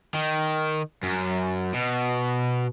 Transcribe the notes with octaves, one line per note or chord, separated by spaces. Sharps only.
D#3
F#2
B2